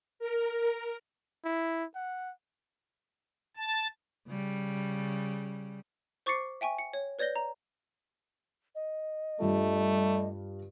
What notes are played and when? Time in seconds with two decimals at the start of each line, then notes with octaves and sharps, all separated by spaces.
0.19 A#4
1.45 E4
1.95 F#5
3.57 A5
4.27 C#3 G3
6.26 C5 C#6 D6 A6 C7 C#7
6.61 E5 G5 G#5 C#6
6.78 C#7
6.94 C#5
7.19 B4 C#5 D5 G6 A#6 G7
7.36 A#5
8.75 D#5
9.40 G2 G3 A3 F4